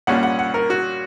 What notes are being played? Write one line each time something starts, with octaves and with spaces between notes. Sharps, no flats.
A#1 A#2 G3 C#4 F#5
F#5
F#5
A#4
F#4